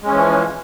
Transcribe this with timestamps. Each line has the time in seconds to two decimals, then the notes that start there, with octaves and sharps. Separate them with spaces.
0.01 G#3
0.06 C#4
0.11 E3
0.16 F3